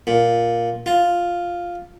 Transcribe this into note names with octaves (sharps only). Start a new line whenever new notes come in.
A#2
F4